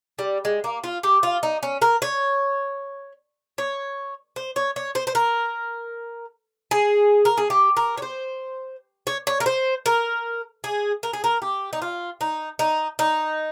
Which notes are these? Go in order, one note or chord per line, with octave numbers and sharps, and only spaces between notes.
G3
G#3
A#3
F4
G4
F4
D#4
C#4
A#4
C#5
C#5
C5
C#5
C#5
C5
C5
A#4
G#4
A#4
G#4
G4
A#4
C#5
C5
C#5
C#5
A#4
C5
A#4
G#4
A#4
G#4
A#4
G4
D#4
F4
D#4
D#4
D#4